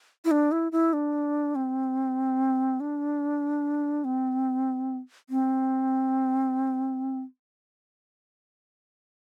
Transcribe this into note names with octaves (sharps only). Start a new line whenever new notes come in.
E4
D4
E4
E4
D4
C4
D4
C4
C4